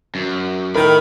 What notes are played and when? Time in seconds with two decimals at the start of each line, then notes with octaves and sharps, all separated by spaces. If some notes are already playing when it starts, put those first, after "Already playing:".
0.15 F#2
0.75 A2 D#3 A#4 B5